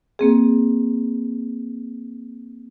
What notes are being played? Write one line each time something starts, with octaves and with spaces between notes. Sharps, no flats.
A#3 C4 G#4